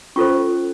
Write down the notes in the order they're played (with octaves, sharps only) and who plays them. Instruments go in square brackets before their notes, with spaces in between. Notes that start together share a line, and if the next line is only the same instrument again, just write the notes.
[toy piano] C#4 F4 A4 C5 C#6